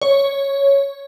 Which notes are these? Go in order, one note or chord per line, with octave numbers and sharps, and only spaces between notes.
C#5